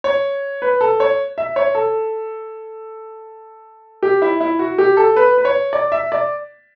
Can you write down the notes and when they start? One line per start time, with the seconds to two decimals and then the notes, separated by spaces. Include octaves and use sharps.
0.04 C#5
0.62 B4
0.81 A4
1.00 C#5
1.38 E5
1.56 C#5
1.75 A4
4.03 G4
4.22 E4
4.41 E4
4.59 F#4
4.78 G4
4.97 A4
5.16 B4
5.38 B4
5.45 C#5
5.73 D5
5.92 E5
6.12 D5